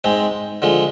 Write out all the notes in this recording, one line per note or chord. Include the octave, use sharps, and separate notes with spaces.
G#2 G#3 C4
D3 F3 G#3